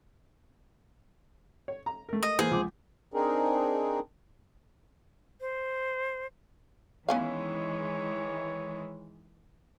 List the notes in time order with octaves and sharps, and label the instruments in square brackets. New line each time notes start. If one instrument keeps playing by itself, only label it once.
[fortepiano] C#5
A#5
A3 A#4
[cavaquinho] D#5
[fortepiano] E3 A#3 [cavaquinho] G#4 C5
[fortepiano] C#2 F3 D6
[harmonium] C4 D4 D#4 G#4 A#4
[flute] C5
[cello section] D#3 E3 G#3 [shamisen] B3 C#4 F5 [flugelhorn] C#5